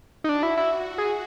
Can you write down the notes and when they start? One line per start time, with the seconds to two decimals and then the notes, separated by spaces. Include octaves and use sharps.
0.24 D#4
0.29 D4 F#4
0.43 E4
0.57 E4
0.98 G#4